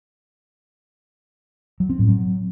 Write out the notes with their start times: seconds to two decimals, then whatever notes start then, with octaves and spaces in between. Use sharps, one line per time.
1.80 F#3
1.90 C4
1.99 A2
2.09 F#3